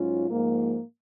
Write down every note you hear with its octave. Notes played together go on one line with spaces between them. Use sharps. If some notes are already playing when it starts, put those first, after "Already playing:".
Already playing: G#2 F#3 C#4 F4
G#2 F3 A#3